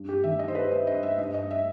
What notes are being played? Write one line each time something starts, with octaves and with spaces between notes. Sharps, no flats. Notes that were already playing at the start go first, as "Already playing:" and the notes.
Already playing: G2
G4
D#3 E5
D#5
C5
G3 B4
D#5
G2 D#5
E5
G2 D#5
D#5
E5